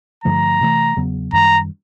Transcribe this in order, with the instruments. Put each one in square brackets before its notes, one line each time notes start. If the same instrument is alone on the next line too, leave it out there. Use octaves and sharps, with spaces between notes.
[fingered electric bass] G2 D3 F3 A3 [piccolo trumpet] A#5
[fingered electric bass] C3 E3 A3
E2 C#3 F#3 B3
[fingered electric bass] F#2 D#3 G3 [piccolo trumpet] A#5